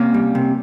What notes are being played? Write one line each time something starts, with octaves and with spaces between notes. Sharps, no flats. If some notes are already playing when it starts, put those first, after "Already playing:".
Already playing: C3 A#3 C#4
G3
C3